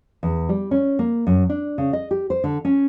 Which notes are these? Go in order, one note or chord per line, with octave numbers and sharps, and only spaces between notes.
E2
G3
C#4
A#3
F#2
D4
C#3
D#5
G4
C5
D3
C#4